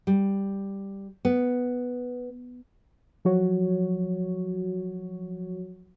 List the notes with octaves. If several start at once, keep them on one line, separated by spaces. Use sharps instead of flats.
G3
B3
F3 F#3 F#4 C#5